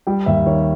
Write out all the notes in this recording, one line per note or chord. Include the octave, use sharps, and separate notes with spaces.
G3 G5
D#2 E5
D#3 C#5